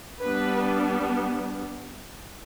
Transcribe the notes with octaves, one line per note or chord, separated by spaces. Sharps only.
G3 B3 D4 B4